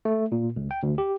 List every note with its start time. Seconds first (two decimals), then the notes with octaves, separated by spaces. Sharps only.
0.05 A3
0.32 A#2
0.56 C#2
0.71 G5
0.83 D2
0.98 G4